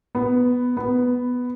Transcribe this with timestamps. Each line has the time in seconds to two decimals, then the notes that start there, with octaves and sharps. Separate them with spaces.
0.15 B3
0.77 B3